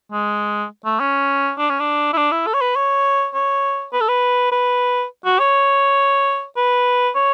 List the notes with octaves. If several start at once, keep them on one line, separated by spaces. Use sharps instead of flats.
G#3
A3
C#4
D4
C#4
D4
E4
D4
E4
A4
C#5
B4
C#5
C#5
B4
A4
B4
B4
F#4
C#5
B4
C#5